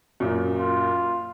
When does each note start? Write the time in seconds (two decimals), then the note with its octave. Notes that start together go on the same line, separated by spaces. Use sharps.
0.20 F#2 A#2
0.58 F4